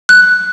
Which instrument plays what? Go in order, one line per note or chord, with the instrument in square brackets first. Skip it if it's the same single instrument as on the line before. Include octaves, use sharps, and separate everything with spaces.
[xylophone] F#6